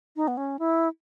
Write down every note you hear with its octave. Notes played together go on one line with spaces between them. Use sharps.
D#4
B3
C#4
E4